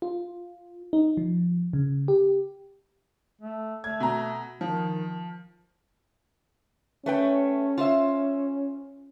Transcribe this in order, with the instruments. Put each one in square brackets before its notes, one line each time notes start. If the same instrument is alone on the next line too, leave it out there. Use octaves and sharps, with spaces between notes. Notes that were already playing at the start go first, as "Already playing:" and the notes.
[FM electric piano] F4
D#4
F3
C#3
G4
[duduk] A3
[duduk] A3 [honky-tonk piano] G#6
[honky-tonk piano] B2 A#5
[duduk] D#3 [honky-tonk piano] F3
[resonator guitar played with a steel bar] A3 B4 G5 [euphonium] C#4
[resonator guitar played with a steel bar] F4 C5 E5